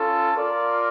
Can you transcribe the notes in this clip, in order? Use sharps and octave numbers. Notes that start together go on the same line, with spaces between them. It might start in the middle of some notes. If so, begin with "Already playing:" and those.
Already playing: C#4 F4 A4
F4 A#4 D5